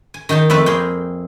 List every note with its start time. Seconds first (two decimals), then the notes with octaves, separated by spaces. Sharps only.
0.14 G#5
0.29 D#3 D#4 G5 A5
0.50 F2 A3 B4 E5 A5
0.66 A#3 C4 G#4 G5